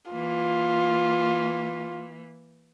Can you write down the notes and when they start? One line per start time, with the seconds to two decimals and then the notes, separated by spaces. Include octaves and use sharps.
0.11 E3 A#3 F4